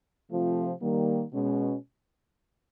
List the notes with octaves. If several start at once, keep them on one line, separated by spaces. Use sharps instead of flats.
C3 F3 A3 C4 F4
D#3 G3 A#3
B2 G#3 C#4